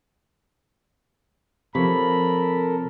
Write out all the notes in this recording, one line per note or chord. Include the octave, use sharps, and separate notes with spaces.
C3 F3 A4 A#4 C#5 B5